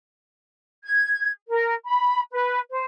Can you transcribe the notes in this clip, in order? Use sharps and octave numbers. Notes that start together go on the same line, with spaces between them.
G#6
A#4
B5
B4
C5